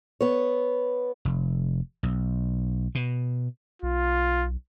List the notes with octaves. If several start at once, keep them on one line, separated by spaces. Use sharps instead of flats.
B3 C#5
F1
B1
B2
B1 F4